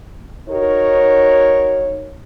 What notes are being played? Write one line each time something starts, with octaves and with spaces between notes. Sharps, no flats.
D#4 F#4 A#4 C#5